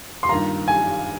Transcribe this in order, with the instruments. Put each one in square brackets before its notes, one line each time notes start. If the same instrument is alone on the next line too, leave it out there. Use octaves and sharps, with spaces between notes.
[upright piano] C6
[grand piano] G2 D#3 A#3 F4 [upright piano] A#5
[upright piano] G#5